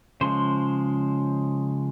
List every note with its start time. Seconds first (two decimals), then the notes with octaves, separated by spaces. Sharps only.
0.21 C#3 F3 G#3 C5